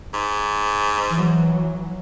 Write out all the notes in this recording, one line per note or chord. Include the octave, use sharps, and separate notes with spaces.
G#2
E3 F#3